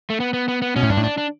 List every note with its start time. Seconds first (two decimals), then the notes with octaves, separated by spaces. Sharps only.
0.10 A3
0.20 B3
0.34 B3
0.48 B3
0.62 B3
0.76 B2 C#4
0.83 A2
0.90 G2 D4
0.97 A2
1.04 D4
1.18 D4